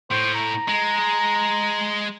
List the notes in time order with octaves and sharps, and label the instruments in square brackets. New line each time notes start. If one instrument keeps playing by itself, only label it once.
[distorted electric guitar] A2 [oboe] C5
[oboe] A#5
[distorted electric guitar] G#3